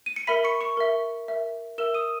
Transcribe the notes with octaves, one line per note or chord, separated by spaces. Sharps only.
D#7
C#7
A#4 E5 B5 B6
C#6 C#7
C#6 C#7
A#4 E5
A#4 E5
A#4 E5 E6 E7
D#6 D#7